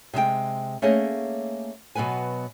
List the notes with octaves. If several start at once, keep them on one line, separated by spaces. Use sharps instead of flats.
C3 G#3 E5 G5
A3 A#3 C#4 G#4 C#5 D#5
B2 F#3 B3 B4 G#5